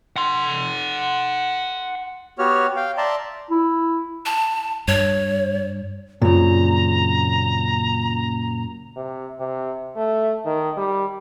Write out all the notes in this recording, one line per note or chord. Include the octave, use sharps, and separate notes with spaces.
F#5 C6
B3 F#4 G4 C#5 F6
F5 G5
D5 E5 A5 A#5 C6
E4
A5
G2 C#5
F#2 A#2 C#3 C4 A#5
C3
C3
A3
D#3
G3